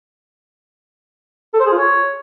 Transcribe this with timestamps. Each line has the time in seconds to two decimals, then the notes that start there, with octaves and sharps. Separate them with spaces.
1.54 A4
1.60 C5
1.66 G#4
1.72 F4
1.78 C#5